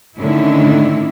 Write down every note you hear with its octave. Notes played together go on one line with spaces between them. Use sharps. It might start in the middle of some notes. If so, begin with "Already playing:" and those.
A2 D3 D#3 C#4 D4 E4